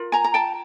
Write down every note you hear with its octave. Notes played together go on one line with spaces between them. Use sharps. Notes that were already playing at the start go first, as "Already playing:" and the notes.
Already playing: F4 A#4
G#5 A#5
A#5
G5 A5